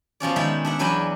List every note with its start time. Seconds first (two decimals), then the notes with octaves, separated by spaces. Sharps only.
0.20 B2 F3 C#4 D5
0.36 D#3 G#3 E5 G5 A5
0.64 D4 E5 F#5
0.79 E2 F#3 D4 B4 G5 G#5